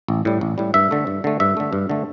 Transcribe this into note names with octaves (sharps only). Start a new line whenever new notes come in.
A1
A2 G3
A1
A2 G3
G2 E5
D3 A3
G2
D3 A3
G2 E5
D3 A3
G2
D3 A3